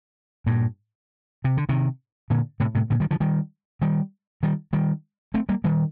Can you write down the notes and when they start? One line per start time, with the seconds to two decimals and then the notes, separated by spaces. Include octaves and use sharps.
0.46 G2 A#2
1.44 C3
1.57 D3
1.69 C3 D#3
2.30 A#2 D3
2.60 A2 C3
2.75 A2 C3
2.90 A#2 D3
3.00 D#3 G3
3.11 D3 F3
3.20 D#3 G3
3.82 D#3 G3
4.43 D#3 G3
4.73 D#3 G3
5.34 A3 C4
5.49 G3 A#3
5.64 D#3 G3